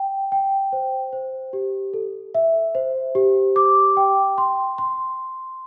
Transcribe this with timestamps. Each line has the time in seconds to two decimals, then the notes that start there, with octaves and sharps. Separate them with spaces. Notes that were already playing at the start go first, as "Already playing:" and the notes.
Already playing: G5
0.32 G5
0.73 C5
1.13 C5
1.53 G4
1.93 A4
2.34 E5
2.75 C5
3.15 G4
3.56 D6
3.97 G5
4.38 C6
4.78 C6